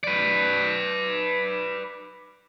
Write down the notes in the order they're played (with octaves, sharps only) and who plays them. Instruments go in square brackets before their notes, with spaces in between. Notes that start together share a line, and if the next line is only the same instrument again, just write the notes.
[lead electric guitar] B4 D5